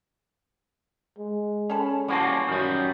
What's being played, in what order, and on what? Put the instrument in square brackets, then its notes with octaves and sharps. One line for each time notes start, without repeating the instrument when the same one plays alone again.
[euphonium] G#3
[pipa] C#4 A4 B5
[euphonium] E3 [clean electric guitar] G3 A#3 C4 [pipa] C#4 F#4 A5
[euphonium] F#2 [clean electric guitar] D#3 G3